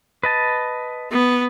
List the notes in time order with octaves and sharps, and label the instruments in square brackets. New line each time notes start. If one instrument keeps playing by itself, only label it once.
[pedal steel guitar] B4 D#5 A5
[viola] B3